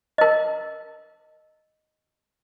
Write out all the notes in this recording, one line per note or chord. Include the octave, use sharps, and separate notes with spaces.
A#4 D#5